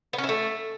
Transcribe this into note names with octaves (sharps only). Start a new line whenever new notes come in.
B3
C#4
E4
A3